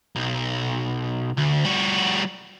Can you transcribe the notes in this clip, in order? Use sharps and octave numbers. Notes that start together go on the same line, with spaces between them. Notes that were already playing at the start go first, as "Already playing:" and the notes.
B1
D2
G3 F#4